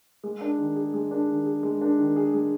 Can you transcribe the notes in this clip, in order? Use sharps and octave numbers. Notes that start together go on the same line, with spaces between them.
G#3
D4
D#3
G#4
G#3
D4
D#3
G#4
G#3
D4
D#3
G#4
G#3